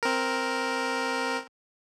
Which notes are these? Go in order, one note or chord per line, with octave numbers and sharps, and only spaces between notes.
C4 A#4